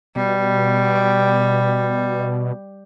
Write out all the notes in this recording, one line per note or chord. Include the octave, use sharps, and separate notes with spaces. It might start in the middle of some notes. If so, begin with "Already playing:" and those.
B2 G3